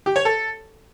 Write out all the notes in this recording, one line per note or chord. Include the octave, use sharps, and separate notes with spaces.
G4
C#5
A4